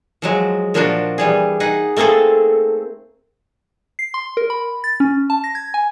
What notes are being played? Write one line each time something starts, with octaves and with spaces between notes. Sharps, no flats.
F3 F#3 G#3
A#2 F3 A#3 D4 F4 F#4
E3 G3 G#4
D#4 G#4 F#5
A3 A#3 C4 G#4 A4
C7
C6
A#4
B5
A6
C#4
A5
A#6
G#6
G#5